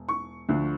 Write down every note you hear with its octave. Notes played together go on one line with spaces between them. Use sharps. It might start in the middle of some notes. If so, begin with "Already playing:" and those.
Already playing: E1
C#6
D2 D3 F3